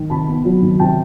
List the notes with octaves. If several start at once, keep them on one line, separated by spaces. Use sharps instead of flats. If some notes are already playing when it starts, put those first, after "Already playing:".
Already playing: D#3
C3 A5 B5
B3
F#3
D#3
C3 G5 A5